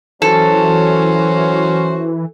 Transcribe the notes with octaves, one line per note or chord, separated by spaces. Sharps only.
E3 F#3 C#4 F#4 A4 C5